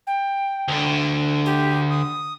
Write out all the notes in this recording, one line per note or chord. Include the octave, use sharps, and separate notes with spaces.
G5
D2 D3
G4
D#6